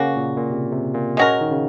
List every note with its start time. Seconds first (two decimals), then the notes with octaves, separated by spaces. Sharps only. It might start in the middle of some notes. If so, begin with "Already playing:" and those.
Already playing: C#3 A#3 C#4 F#4
0.17 A#2
0.37 A#2
0.50 C3
0.72 C3
0.95 A#2
1.17 G#3 C#4 F#4 A#4
1.41 D#3
1.51 C#3